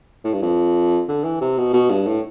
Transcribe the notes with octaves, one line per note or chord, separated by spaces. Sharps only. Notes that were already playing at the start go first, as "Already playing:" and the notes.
A2
G2
F2
D3
E3
C3
B2
B2
G2
A2